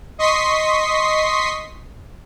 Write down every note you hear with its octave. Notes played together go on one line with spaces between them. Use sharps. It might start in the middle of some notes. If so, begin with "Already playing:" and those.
D#5 C6 C#6 D#6 B6 C7